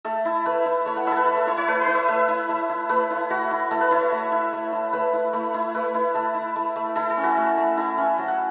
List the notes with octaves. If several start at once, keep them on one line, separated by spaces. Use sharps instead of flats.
A3 A4
E4
A3 B4
E4
A3 C#5
F#5
E4 A4 E5
B4
A3
A4
E4 C#5
C#5
A3 B4
B4
E4
E5
A3 E5
E4
A3
E4
A3 B4
E4
A3 F#4
E4
A3 A4
B4
E4 C#5
C#5
A3
E4
A3
E4
A3 B4
E4
A3
E4
A3 B4
E4
A3 A4
E4
A3
A3
E4 A4
A4
C#4
F#4
A3
A3
E4 A4
C#4
F#3
F#5